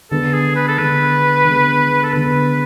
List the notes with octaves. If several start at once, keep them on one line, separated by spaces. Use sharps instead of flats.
D3 G#3 B3 A4
G#4
B4
A4
D3 G#3 B3 B4
D3 G#3 B3
A4
D3 G#3 B3 B4